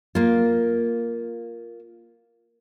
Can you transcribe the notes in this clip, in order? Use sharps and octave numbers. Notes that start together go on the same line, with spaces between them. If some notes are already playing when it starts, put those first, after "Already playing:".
A#3 F4